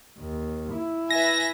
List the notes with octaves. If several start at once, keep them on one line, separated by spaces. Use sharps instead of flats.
D#2
E4
B4 E5 G#5 A#6